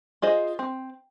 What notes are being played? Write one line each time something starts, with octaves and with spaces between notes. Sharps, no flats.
F4 G#4 C5 D#5
C4